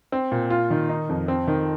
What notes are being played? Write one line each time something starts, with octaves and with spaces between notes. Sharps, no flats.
C4
A#2
F4
D#3
D#4
F2
C4
D#3